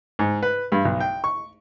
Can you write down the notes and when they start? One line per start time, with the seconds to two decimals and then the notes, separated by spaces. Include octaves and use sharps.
0.19 G#2
0.43 B4
0.72 G2
0.85 B1
1.00 G5
1.24 C#6